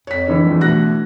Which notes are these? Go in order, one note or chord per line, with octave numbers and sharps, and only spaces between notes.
F2 C#5 B6
D3 E3 C4
A#1 E2
B2 A3 F#6 A#6